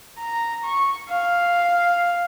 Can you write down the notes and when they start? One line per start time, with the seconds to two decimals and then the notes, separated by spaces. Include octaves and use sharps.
0.19 A#5
0.64 C#6
1.09 F5